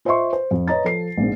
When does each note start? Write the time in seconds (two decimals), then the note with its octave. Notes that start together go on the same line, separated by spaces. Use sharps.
0.05 F4 C5 D#5 E5 C6 C#6
0.33 C5
0.51 F2
0.68 B4 C#5 D#5 A#5 A6
0.84 F3 A4 C7
1.18 A#1 G#2